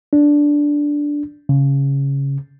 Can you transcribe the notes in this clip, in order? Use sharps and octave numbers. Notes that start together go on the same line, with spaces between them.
D4
C#3